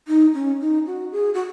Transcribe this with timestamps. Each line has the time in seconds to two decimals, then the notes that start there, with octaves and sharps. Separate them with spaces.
0.08 D#4
0.34 C#4
0.60 D#4
0.87 F#4
1.12 G#4
1.34 F#4